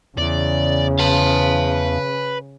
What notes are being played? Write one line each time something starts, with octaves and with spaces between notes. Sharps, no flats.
E2 C#3 D5
B4 F5 A5